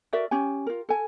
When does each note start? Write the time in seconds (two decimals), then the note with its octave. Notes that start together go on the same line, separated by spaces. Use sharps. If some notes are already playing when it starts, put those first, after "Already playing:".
0.13 F#4 A#4 D5 E5
0.31 C#4 G4 G#5
0.67 F4 A#4
0.89 A4 G#5